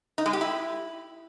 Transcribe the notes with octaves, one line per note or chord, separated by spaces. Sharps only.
D#4
G#3
G4
E4